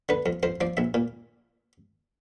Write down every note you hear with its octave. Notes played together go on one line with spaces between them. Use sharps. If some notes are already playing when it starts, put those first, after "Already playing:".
D3 B4
F2
F2 C5
F3 D5
A#1 E5
A#2